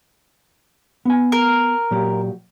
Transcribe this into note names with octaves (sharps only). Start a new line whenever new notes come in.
B3 G#5
A#4
A#2 F#3 G4